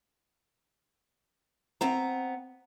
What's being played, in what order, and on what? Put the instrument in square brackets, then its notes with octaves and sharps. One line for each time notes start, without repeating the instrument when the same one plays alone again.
[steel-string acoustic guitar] B3 C4 A#5